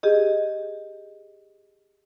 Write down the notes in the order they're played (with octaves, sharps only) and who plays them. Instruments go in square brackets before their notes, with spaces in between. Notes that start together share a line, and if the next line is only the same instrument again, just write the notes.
[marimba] G4 G#4 D#5